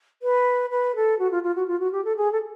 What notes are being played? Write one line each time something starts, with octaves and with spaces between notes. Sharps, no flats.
B4
B4
A4
F#4
F4
F4
F#4
F4
F#4
G4
A4
G#4
A4